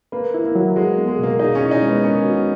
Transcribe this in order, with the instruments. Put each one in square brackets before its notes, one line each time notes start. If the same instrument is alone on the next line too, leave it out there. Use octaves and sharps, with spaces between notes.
[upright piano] A#3 [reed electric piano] B4
[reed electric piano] E4
[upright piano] A#3
[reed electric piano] F#3
[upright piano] G#3 [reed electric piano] F#4
[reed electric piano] B3
[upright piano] G#3
[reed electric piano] B2 [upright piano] A#3
[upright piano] D#4 [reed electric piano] G#4
[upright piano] C#4
[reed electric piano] E4
[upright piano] D#4
[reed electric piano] G#3 [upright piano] B3
[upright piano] C#4 [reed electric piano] A#4
[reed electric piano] F#4